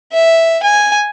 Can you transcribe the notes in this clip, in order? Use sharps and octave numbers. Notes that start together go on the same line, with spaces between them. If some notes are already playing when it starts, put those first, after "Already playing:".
E5
G#5